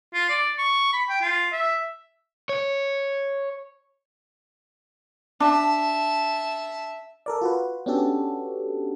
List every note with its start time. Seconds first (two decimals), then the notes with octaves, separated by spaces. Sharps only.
0.14 F4
0.29 D5
0.58 C#6
0.93 B5
1.09 G5
1.22 F4
1.52 E5
2.49 C#5
5.40 D4 E5 A5
7.26 A4 A#4 D5
7.41 F4 F#4 B4
7.86 B3 C#4 D4 F#4 G4 A4